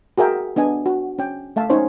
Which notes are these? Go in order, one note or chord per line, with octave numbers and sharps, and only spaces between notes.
F#4 G#4 A#4 E5 G5
B3 D4 D#5 G#5
F#4
C#4 G5
A3 E5 F5 A5
C#4 D#4 C5 C#5